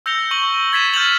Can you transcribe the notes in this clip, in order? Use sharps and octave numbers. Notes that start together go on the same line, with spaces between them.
E6 G6 A#6 C#7 F7 G7
C#6 F#7
C#6 G#6 A6 B6 D#7 E7
F6 G6 A6 F7 F#7